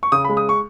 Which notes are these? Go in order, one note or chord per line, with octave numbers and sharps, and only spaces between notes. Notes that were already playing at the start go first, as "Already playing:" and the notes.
C#6
C#3 D#6
B5
G#3
D#6
C#6